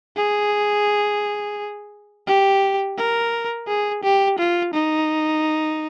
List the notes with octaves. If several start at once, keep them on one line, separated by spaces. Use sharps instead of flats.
G#4
G4
A#4
G#4
G4
F4
D#4